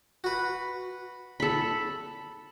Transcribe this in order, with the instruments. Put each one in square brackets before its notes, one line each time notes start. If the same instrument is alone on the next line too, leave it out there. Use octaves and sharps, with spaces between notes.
[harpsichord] F#4 B4
[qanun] A4 B5